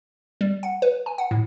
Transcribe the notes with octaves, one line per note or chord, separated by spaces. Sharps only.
G3
F#5
B4
G#5
F#5
A2